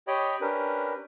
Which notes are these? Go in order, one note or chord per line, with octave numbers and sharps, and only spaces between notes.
G4 C#5 D#5 G5 B5
C#4 D4 G4 A#4 B4